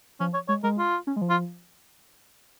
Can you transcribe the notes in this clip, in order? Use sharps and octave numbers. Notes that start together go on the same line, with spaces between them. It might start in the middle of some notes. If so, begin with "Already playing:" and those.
F3 C#4
C#5
G#3 C#5
G#3 A#4
F4
C#4
G#3
F3
F4